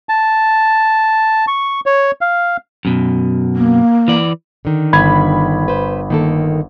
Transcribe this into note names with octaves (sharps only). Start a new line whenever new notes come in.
A5
C#6
C#5
F5
F#2 B2
A#3
E3 D5
D3 D#3
G1 B5 G#6
B4 C5
D#3 A#3 A4